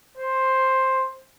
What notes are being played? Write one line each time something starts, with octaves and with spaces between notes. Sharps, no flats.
C5